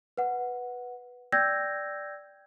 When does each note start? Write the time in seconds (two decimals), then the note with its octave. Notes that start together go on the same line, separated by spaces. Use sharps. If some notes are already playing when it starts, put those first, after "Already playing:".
0.17 B4 F#5
1.32 D5 G5 E6 G6 G#6 A#6